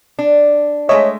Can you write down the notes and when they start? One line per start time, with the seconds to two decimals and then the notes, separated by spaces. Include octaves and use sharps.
0.19 D4
0.89 G#3 A3 C#5 D#5 E5